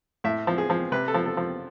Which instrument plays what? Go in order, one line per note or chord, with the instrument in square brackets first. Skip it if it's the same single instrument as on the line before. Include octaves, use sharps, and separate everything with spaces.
[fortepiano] A2 E5
F3
G#4
F3
C3 B4
A4
F3
A4
F3